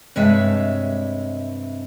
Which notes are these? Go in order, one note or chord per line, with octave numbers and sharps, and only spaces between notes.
G2 C3 G#3 C#5 E5 A5